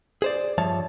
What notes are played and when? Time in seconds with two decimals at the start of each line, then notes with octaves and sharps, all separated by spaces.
0.22 G#4 C5 D5
0.58 G2 F3 C#5 E5 A5